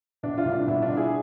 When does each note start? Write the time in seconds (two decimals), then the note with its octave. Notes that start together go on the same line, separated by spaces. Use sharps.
0.23 B2 D4
0.38 D4 F4
0.45 C2
0.53 D4
0.67 B2 E4
0.82 D4 F4
0.90 B2
0.97 E4 G#4